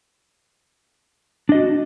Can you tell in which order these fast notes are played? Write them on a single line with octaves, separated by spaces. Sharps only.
D4 D#5 F#4